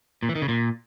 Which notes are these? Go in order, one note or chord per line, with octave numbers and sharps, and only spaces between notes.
A#2
E3
D#3
C#3
A#2